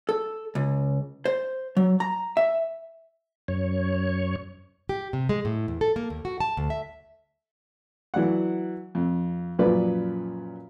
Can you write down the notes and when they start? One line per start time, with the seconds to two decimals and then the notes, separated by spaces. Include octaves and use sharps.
0.09 A4
0.55 C#2
1.25 C5
1.77 F#3
2.00 A#5
2.37 E5
3.48 F#2 C#5
4.89 G4
5.13 C3
5.29 G#3
5.45 A2
5.68 E2
5.81 A4
5.96 A#3
6.10 D#2
6.25 F#4
6.40 A5
6.57 D2
6.70 E5
8.14 E3 F#3 D5 F#5
8.95 F2
9.59 F#2 A#2 F3 B4 D5